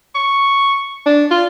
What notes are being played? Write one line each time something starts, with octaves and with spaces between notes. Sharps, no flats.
C#6
D4
F4